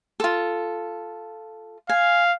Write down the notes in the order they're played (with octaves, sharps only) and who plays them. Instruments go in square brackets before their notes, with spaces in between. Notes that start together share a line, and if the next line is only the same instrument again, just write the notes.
[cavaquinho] F4 A4
[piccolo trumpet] F5 [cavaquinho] G#5